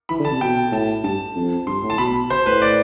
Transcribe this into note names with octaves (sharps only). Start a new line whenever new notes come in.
E3 B5
D3
A5
C3
B2 G5
A2 A5
G2 A5
F2
G2 C6
A2
A5
B2 B5
C5
A2 B4
D5